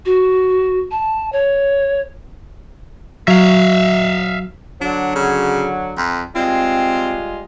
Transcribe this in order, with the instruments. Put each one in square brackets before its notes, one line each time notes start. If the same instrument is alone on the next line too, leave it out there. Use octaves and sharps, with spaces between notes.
[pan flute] F#4
A5
C#5
[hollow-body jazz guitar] F#3 [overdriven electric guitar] E5 F5
[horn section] D3 F#3 [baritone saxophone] D4
[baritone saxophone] C#3
F2
[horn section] G3 G#3 F4 [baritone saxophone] C4